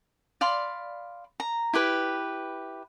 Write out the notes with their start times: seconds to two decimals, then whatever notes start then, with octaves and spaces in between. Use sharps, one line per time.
0.41 D5 F5 B5 C6
1.40 A#5
1.73 E4 G4 B4 B5